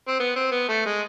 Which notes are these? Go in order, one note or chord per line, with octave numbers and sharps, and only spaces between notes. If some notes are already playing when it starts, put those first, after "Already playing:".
C4
B3
C4
B3
A3
G#3